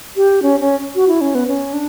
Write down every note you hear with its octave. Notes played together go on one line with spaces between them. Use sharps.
G4
C#4
C#4
F#4
E4
C#4
B3
C#4
D4